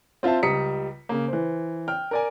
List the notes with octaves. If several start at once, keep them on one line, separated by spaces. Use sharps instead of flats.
C4 F4 C5 E5 A5
C#2 G3 A#5 D#6 B6 C#7
C#3 A#3
E3 C5
G5 F6
A#4 D5 G#5